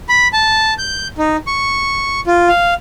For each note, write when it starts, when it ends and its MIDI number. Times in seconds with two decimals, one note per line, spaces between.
0.09 0.28 83
0.33 0.74 81
0.78 1.08 91
1.18 1.37 63
1.47 2.20 85
2.27 2.49 65
2.49 2.74 77